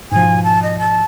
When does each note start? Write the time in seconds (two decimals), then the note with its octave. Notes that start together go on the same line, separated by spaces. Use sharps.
0.12 G#2 B2 F3 G#5
0.44 A5
0.63 D#5
0.79 A5